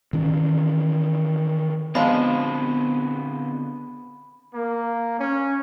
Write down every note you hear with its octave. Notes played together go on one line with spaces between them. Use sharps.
D#3 E3 C#4
D3 F3 G#3 B3 C4 B5
A#3
C#4